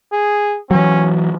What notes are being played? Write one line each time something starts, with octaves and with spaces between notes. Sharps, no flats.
G#4
E3 F#3 C#4